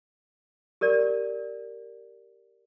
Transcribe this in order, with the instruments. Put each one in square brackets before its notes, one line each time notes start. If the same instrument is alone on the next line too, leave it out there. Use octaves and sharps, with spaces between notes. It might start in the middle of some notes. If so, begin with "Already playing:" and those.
[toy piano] G4 A#4 D5